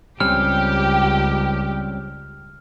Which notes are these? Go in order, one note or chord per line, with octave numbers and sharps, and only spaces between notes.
C#2 G3 C4 C#4 G4 F6